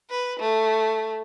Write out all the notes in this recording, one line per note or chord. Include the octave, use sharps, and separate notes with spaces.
B4
A3